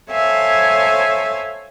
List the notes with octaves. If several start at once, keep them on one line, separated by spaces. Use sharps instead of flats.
A4 C5 C#5 E5 F5 G#5